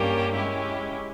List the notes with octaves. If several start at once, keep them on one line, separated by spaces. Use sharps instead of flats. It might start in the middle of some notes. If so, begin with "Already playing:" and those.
Already playing: G2 G3 A#3 C#4 G4
G#3 C#4 E4 G4